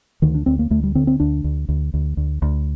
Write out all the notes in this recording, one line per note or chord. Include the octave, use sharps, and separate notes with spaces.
D2 D#3
D4
D2 C4
A#3
D2 A3
G3
D3 C4
C4
D2 D4
D2
D2
D2
D2
D2